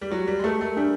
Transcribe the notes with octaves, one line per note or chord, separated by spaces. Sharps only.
G3
F#3 G4
G3
G#3
A3 A#4
A3
G3 D4